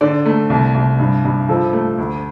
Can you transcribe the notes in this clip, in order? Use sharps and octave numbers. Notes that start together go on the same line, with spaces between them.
D3 D5
A3
C2
C2
G2
G2
F3 A4
A3
D2